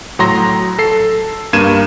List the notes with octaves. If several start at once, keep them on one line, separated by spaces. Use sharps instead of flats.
A2 F#3 A#5 C6 A#6
A4 C7
G2 A#3 G#6 D#7 E7